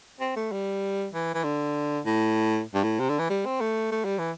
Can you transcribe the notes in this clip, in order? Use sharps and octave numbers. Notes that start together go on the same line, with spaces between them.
C4
A3
G3
E3
E3
D3
A2
G2
A2
C3
D3
E3
G3
C4
A3
A3
G3
E3